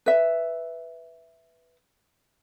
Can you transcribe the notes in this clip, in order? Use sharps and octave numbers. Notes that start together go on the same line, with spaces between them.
B4 E5